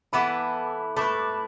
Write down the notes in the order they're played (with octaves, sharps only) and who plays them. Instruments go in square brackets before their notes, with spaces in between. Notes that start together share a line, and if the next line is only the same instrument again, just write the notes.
[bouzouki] E3 B3 E4 A4 [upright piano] B5 D6
[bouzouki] A3 E4 B4 [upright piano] B5 D6